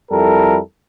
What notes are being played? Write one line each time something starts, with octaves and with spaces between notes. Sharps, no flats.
F2 G3 E4 A4 A#4